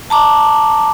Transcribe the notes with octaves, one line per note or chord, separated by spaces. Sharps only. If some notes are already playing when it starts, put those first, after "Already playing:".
A5 A#5 D6